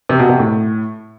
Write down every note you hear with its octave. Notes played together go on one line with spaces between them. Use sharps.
C3
B2
C3
A2